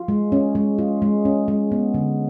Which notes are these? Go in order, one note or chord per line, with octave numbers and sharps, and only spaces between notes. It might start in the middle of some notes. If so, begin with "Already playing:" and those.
Already playing: F4
G#3
C#4
G#3
F4
G#3
C#4
G#3
B3
D3